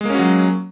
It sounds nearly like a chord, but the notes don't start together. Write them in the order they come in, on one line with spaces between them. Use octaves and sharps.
G#3 A#3 C#4 F#4 F#3